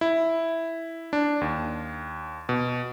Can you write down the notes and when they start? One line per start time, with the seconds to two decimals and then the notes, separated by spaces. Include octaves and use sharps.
0.01 E4
1.13 D4
1.41 D#2
2.49 B2